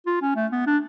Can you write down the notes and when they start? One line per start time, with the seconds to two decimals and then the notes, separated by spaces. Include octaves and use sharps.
0.06 F4
0.22 C#4
0.36 A3
0.52 B3
0.67 D4